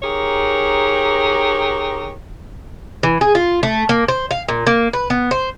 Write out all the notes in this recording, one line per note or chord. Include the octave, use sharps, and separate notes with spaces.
D#4 G4 G#4 A#4 C#5
E3
G#4
F4
A3
A#3
C5
F5
A#2
A#3
B4
B3
C5